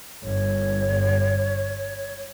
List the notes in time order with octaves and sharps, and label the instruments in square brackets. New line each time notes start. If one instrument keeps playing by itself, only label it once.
[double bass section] G1 G2 [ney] C#5